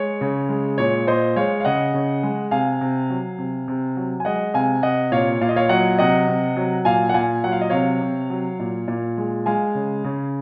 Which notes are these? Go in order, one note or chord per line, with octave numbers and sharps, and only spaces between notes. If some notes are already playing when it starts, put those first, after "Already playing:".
Already playing: G#3 C#5
C#3
G#3
A#2 C#5
A#2 C5 D#5
G#3 C#5 F5
F5
C#3 D#5 F#5
C#3
G#3
C3 F5 G#5
C3
F#3
C3
C3
F#3
G#5
G#3 D#5 F#5
C3 F5 G#5
C3 D#5 F#5
A#2 C#5 F5
A#2 F5
D#5
C#5 F5
F#3 D#5 F#5
C3 D#5 F#5
C3
F#3
A#2 F5 G#5
F#5
A#2 F5 G#5
F#3 F#5
F5
D#5
C3 C#5 F5
C3
F#3
A#2
A#2
G#3
G#3 F5 G#5
C#3
C#3